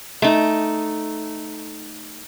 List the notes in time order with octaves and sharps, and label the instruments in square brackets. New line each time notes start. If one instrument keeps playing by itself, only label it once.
[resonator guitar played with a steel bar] A3 D#4